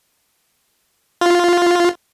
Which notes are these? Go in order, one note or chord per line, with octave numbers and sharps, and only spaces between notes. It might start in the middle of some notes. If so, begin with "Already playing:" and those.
F4